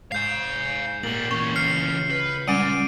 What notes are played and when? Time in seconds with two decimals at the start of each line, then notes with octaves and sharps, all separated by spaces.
0.12 G#2 F5 G#5 G6 C7
1.03 A#2 G3 A#3 F#7
1.31 A#2 E3 C#4 C#6
1.55 C#2 F6 C7 C#7
2.10 B4
2.48 G3 G#3 C#4 F#5 D6 D7 D#7